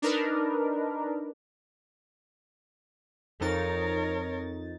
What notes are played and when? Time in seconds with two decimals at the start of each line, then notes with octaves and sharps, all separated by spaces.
0.02 D4 D#4 A#4 B4
3.41 F2 D#4 A#4 C#5 A6